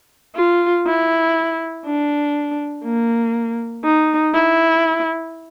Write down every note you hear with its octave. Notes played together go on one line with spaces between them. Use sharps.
F4
E4
D4
A#3
D#4
E4